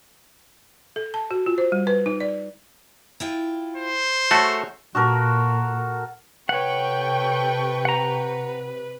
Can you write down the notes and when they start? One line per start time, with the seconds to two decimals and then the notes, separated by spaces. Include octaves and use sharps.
0.96 A4
1.14 A5
1.31 F#4
1.46 F4
1.58 C5
1.72 G3
1.87 B4
2.06 D#4
2.20 D5
3.20 E4 F4 G5
3.77 C5
4.31 A3 F#4 G#4 A4 C#5
4.95 A#2 F#4 A4 A#4
6.49 C3 A4 B4 C#5 F#5 G5 C#6
7.85 F#5 A#5